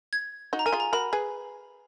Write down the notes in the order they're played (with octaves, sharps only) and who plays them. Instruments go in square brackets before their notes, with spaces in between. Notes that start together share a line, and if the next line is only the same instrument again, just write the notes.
[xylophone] G#6
[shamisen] D#4 F#4
[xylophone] A#5
[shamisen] A#4 [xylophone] G#5
[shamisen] F4 G#4
[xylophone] A#5
[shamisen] F#4 A#4 [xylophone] B5
[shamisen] G#4 B4